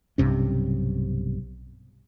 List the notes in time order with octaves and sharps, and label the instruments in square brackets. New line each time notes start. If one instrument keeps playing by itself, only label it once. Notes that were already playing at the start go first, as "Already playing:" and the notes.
[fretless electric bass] B1 G2 C3 C#4